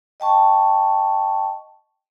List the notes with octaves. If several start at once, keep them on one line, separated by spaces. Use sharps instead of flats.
D#5 G5 A5 C#6